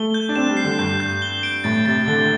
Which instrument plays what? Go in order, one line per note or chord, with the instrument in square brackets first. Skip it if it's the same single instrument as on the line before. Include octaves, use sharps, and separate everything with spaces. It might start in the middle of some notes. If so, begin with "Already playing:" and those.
Already playing: [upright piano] A3 [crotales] G7
[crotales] G6
[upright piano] D4
[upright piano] C4 [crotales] E7
[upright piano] G3
[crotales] C7
[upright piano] D3
[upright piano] G2 [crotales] G6
[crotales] G6
G7
D7
[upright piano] A2 [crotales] A6
[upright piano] C3 [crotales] A6
[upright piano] D3 [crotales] G7